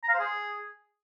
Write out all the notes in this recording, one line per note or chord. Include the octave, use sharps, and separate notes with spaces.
A#5
F5
C5
G#4